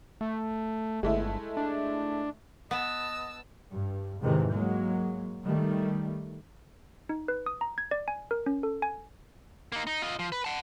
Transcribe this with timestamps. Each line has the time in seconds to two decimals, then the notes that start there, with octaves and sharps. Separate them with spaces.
0.21 A3
1.03 G1 G#3 A3 E4
1.57 D4
2.71 B3 D#5 A5 E6
3.71 G2
4.20 E2 G#2 C3 D#3 E3
4.51 F#3 G#3 A#3
5.43 D#3 G3 A3
7.09 D#4
7.28 B4
7.46 D#6
7.61 A#5
7.78 G#6
7.91 D5
8.08 G#5
8.31 A#4
8.46 C#4
8.63 A4
8.82 G#5
9.72 A#3 D#4
9.87 D#4
10.02 F4 D#5
10.19 F3
10.32 B4
10.44 F#5 A5